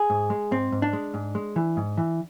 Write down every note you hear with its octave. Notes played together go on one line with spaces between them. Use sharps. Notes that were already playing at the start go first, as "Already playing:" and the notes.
Already playing: G#4
G#2
G#3
G#2 C4
G#2
D4
G#3
G#2
G#3
E3
G#2
E3